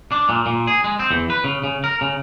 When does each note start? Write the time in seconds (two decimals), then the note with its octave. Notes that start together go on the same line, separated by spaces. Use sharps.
0.12 D4
0.29 A#2
0.46 A#2
0.67 G#4
0.84 G#3
0.99 C4
1.11 E2
1.30 B4
1.44 C#3
1.64 C#3
1.84 A#4
2.01 C#3